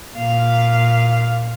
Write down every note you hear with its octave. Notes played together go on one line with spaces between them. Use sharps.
A#2 F5